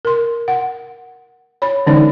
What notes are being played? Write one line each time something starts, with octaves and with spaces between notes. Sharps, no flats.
A#4 C6
F#5
C#5 B5
D3 E3 G#3 C#4 D#4 D5